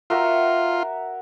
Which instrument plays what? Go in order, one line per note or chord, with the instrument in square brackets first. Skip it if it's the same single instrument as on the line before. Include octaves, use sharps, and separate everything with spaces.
[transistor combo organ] F4 [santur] F#4 A#4 E5